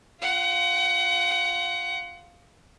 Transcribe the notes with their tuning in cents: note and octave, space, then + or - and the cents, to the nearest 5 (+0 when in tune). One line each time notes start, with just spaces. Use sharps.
F4 +0 F#5 +30